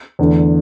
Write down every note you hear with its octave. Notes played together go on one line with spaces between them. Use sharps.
E2 D3 A3